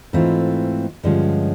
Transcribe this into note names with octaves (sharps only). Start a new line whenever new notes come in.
G#2 E3 A3 C4 F4
G2 D3 F3 G#3 C#4